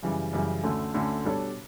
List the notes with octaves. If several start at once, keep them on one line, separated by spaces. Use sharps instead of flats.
F#2 C#3 E3 G3
F#2 C#3 E3 G3
D2 D3 A3 C#4
D2 D3 A3 C#4
B2 G3 D4 A4 C#5